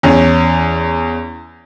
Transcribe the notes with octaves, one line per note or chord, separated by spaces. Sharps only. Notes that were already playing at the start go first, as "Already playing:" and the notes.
E2 C#4